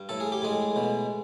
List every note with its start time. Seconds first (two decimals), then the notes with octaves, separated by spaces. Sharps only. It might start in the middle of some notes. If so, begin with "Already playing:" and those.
Already playing: G2
0.09 A2 A4
0.20 G#4
0.32 G4
0.42 A2 G#3 G#4
0.76 B2